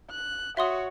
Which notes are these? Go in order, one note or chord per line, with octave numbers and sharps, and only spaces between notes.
F#6
F#4 C#5 E5 C6 D#6